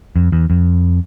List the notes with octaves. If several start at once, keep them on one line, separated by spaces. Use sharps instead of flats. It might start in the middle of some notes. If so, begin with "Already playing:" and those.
F2
E2
F2